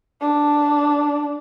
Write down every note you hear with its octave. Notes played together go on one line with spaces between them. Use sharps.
D4